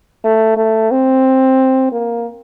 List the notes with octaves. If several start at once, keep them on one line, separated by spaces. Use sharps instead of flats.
A3
A3
C4
A#3